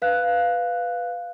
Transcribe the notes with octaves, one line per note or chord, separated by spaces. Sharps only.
B4 F5 F#6